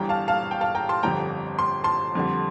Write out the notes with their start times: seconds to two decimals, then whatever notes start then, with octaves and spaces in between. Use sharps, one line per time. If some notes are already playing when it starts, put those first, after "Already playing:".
Already playing: G1 G2 E3 G3 G5 A#5
0.09 F5 A5
0.28 F5 A5
0.51 G5
0.61 F5 A5
0.75 G5 A#5
0.89 A5 C6
1.03 G1 F2 D3 G3 C4 G5 A#5
1.59 C6
1.84 A5 C6
2.15 F2 D3 G3